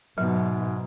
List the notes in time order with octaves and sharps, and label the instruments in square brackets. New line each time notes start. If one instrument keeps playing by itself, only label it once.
[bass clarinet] G#2 [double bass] B2 [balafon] F#3